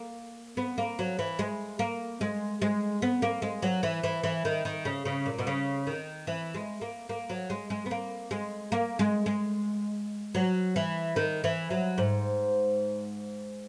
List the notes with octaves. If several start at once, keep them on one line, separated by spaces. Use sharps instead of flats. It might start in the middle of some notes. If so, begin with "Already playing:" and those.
Already playing: A#3
B3
A#3
F#3
E3
G#3
A#3
G#3
G#3
B3
A#3
G#3
F#3
E3
E3
E3
D#3
D#3
C#3
C#3
A#2
B2
C#3
D#3
E3
G#3
A#3
A#3
F#3
G#3
G#3
B3
A#3
G#3
A#3
G#3
G#3
F#3
E3
D#3
E3
F#3
G#2